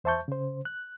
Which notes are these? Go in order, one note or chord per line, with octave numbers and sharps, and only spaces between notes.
E2 C5 E5 A5 C#6 G6
C#3 C5
F#6